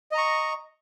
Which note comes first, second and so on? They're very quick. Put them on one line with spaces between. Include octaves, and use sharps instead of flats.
D#5 A#5 C#6